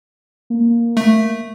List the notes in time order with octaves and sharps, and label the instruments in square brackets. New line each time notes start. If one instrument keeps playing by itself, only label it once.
[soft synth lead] A#3
[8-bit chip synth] A3